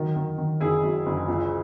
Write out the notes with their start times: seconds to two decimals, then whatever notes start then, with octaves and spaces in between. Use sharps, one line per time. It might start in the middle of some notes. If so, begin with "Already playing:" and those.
Already playing: D#3 F#3
0.16 D#3
0.38 D#3
0.60 F#1 E4 G#4
0.84 F#2
1.06 F#1
1.28 C#2